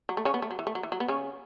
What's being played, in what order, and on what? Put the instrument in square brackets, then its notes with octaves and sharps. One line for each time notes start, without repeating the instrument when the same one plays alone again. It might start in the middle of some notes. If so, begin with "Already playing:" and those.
[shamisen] F#3
A3
C#3 C#4
B3
A3
F#3
E3
A3
F#3
E3
F#3
B3
C#3 C#4